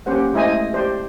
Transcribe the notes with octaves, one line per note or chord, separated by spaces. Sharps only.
A#3 C#4 G4 C5 F#5
G#3 A3 E4 C5 D#5 G#5
G4 C5 D5